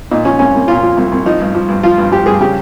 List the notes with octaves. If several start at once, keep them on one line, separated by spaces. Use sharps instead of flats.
A#2 D#4
F3 C#4
C2 C#4
C2
A#2 F4
F3
C2
C2
F3 D#4
G2
F3
G2
F3 F4
G2
F3 G4
G2 G#4
C#3 G4